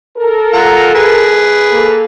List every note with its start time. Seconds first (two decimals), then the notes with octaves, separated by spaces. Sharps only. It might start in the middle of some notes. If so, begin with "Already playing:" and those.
0.17 A4 A#4
0.54 F4 F#5 A#5
0.94 G#4 B4
1.70 A#3 A4